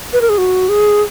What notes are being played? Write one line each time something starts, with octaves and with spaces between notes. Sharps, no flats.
B4
A#4
G#4
F#4
G#4